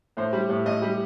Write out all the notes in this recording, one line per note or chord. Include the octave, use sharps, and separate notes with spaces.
A2 C5
G3
A2
A2 D#5
G3